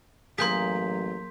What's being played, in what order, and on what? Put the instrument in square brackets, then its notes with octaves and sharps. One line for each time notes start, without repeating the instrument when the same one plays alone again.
[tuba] A1 [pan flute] F#3 [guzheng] A#3 G#4 [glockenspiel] C6 G6 B6